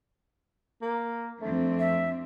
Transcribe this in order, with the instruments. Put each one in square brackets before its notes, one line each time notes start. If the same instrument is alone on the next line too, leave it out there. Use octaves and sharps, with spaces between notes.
[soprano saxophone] A#3
[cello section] F2 C4 D4 [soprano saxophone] A3
[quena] E5